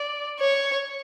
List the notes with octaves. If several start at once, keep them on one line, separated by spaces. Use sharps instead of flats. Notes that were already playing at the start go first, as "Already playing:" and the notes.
Already playing: D5
C#5